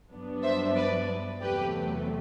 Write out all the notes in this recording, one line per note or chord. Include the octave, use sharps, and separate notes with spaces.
G2 F#3 B3 D4
C5 E5
B4 D5
E2 C3 F#3 A3 G4 B4